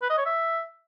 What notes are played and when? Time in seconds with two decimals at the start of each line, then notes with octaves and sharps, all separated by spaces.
0.02 B4
0.10 D#5
0.18 C#5
0.26 E5